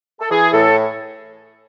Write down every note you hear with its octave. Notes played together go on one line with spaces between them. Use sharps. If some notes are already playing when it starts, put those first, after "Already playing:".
A4
E3 G#4
A2 A4